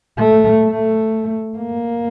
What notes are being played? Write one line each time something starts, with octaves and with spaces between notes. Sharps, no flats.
A3
A3
A#3